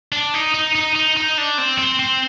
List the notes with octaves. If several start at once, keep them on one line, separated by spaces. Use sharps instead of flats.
D4
D#4
D#4
D#4
D#4
D#4
D4
C4
C4
C4